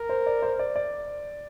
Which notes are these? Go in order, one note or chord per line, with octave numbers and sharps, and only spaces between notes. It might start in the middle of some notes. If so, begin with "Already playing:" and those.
Already playing: A#4
C5
D5
C5
D5
D5